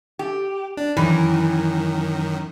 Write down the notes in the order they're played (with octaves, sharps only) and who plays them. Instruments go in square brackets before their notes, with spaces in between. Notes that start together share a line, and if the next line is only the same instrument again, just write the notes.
[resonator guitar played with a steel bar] G4
[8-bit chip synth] D4
[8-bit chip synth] F#2 D#3 [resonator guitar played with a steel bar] E3